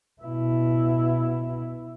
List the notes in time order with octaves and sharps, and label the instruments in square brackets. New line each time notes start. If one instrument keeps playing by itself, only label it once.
[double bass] B2 E4